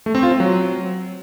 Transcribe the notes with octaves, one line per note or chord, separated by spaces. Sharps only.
A3
C4
F4
C4
F#3